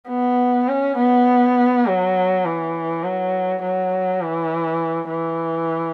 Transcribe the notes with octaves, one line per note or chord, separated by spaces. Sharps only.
B3
C#4
B3
F#3
E3
F#3
F#3
E3
E3